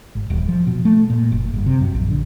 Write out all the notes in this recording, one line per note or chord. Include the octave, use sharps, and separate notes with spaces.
G#1
D#1
F3
B2
A3
A#2
F#1
G1
C3
F#2
A#1
D3